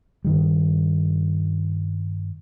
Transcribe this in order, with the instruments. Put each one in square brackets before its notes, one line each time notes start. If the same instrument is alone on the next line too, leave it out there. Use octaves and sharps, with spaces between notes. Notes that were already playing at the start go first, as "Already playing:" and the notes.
[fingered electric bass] G2 D#3 G3